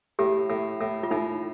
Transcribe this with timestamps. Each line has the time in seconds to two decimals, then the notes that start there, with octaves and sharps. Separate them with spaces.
0.19 A2 G4
0.50 A2
0.81 A2
1.03 F4
1.11 A2 D#4